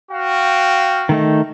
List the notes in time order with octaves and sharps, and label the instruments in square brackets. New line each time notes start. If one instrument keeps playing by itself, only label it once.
[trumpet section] F#4 F5 G5
[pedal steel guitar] D#3 A3 D#4